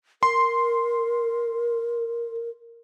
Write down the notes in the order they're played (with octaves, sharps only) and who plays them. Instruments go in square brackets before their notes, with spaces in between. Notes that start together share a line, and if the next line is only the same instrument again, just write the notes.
[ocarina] A#4 [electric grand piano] C6